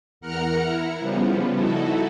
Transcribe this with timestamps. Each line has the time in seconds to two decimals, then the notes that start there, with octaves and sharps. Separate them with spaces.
0.21 E2 A#4 F#5 A#5 F6 C#7
0.62 E4
1.00 C#3 F3 G3 B3
1.55 D#4 E4 F#4 A4